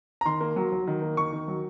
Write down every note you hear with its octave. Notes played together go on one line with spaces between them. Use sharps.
A#5
D#3 C6
A#3
F#3
F#3
D#3
A#3
D#3 C#6
D#3
F#3